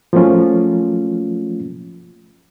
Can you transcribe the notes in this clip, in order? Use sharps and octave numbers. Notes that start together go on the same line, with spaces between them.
F3 F#3 A3 A#3 C#4 F4